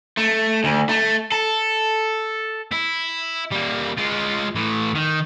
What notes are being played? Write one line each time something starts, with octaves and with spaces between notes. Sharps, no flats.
A3
D2
A3
A4
E4
G3 A#3
G#3 F4
A2 E3
D#3